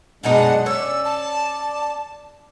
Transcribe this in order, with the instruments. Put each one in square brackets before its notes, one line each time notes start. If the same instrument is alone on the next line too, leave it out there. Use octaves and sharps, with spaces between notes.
[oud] F#2 B2 D#4 [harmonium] G#3 D4 [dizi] F#5
[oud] C#4 [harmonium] D5 [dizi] E6
[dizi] A5